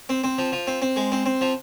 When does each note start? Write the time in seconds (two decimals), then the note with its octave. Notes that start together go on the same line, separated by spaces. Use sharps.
0.09 C4
0.24 C4
0.38 F3
0.52 F3
0.67 C4
0.82 C4
0.96 G#3
1.12 C4
1.26 C4
1.41 F3